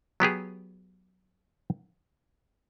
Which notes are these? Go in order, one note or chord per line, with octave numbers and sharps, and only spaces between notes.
F#3 B3 G4 G#4